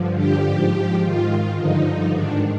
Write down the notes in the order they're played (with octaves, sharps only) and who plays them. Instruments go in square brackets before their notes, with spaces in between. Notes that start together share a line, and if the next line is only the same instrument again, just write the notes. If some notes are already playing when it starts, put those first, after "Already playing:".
Already playing: [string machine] G2 D3 F3
G4
G#2 F3
G#2 D#3 F4
G2 D3 F3 D#4
G#2 D#3 D4